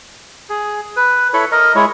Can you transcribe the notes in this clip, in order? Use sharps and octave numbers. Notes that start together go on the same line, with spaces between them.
G#4
B4
E4 A4 C#5 B5
A#4 D#5
G#3 E4 C#5